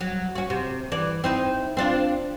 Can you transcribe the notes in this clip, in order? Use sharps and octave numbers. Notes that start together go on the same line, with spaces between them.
F#3
C#4 F#4
C3
E3 D5
C4 D#4 E4
C4 D4 F4